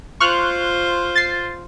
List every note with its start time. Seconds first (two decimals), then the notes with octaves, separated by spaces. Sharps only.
0.20 F4 C5 C#6 F6 F#6
1.15 A6 C7